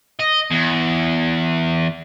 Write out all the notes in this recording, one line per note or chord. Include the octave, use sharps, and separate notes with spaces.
D#5
E2